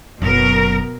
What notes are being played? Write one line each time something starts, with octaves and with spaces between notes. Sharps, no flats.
F#1 B2 F#3 A#4